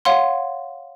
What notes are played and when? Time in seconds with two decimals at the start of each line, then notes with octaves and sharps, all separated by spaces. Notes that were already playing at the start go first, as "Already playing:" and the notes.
0.05 C#5 F5 F#5 C6